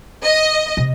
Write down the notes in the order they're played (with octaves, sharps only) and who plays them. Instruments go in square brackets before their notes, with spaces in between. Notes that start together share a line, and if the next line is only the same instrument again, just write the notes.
[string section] D#5
[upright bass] C3